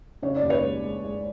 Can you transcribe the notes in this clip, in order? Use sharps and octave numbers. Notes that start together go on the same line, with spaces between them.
C#3 C#5
D5
D#2
B4 C#5
G#3
G#3
G#3